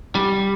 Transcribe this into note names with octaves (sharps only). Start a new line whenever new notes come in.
G3